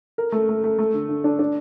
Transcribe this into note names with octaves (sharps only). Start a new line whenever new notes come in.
A#4
A3
A3
A3
A3
D3
D3
D4
D4